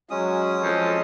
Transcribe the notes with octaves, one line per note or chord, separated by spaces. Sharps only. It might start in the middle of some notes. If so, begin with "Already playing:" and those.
F#3 G#3 C#4 D#6
F2 A4